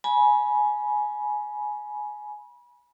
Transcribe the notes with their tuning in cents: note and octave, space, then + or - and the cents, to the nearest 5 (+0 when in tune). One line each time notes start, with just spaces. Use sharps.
G#5 +15 B5 -30